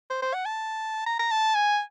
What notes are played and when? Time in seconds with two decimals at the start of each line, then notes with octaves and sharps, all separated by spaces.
0.10 C5
0.22 C5
0.34 F#5
0.46 A5
1.07 A#5
1.20 A#5
1.31 A5
1.55 G#5